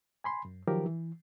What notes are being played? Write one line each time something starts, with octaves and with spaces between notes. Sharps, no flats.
G#5 B5 C6
F#2
D#3 F3 F#3 G4 A#4
E3